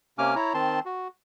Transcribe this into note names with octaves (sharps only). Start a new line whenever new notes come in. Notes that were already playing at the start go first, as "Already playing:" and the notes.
C3 A#3 C#4 G#5 D6 F6
E4 C#5 A#5
D#3 C4 A5 C6
F#4